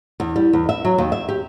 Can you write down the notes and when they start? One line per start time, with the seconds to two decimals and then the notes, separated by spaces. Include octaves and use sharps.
0.20 E2
0.36 G3
0.53 E2
0.69 E5
0.85 F#3
0.98 D#2
1.12 E5
1.29 G4